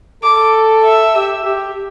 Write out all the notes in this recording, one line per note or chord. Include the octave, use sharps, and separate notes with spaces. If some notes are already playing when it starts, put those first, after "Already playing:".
A4 D6
E5
G4
G4